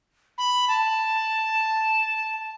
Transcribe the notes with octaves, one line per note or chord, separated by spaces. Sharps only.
B5
A5